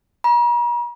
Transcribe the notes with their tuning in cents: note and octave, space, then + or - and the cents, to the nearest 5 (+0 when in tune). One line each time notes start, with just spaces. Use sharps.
A#5 +45